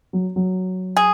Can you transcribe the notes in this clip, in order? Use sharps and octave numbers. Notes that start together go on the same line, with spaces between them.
F#3
F#3
G#4